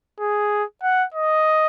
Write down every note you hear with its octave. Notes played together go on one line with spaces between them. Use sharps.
G#4
F#5
D#5